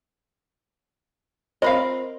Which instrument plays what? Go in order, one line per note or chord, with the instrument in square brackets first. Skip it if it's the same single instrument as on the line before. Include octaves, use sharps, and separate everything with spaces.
[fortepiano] C4 A#4 [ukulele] F4 B5 [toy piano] C5 [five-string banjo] D#5 F5